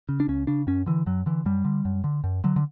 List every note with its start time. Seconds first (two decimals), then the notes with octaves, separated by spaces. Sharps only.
0.09 C#3
0.20 D4
0.28 C#2 C#4
0.47 C#3 D4
0.67 F#2 C#4
0.86 D3 E3
1.06 F#2 F#3
1.26 D3 E3
1.46 F#2 G3
1.65 D3
1.85 F#2
2.04 D3
2.24 F#2
2.44 D3 F#3
2.56 D3